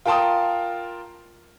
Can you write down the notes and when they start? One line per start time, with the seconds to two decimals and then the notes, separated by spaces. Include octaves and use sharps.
0.06 F4 A#4 G5 A5 C6 D#6